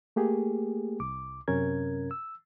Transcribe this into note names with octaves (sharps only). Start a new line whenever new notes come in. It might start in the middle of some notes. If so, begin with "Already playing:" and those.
A3 A#3 G4 G#4
C2 D6
F#2 C3 C#4 A#4 G#6
E6